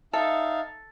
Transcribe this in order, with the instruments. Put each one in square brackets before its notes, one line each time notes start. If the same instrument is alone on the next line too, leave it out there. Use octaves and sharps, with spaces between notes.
[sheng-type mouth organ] D#4 E5 F5 [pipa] A4